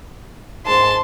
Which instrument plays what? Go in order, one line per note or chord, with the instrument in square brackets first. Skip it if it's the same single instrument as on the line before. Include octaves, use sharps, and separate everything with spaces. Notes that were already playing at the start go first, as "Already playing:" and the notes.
[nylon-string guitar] G#2 G#4 [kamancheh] A5 [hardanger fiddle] C6